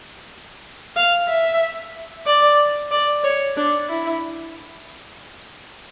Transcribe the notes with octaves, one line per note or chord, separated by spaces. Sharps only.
F5
E5
D5
D5
C#5
D4
E4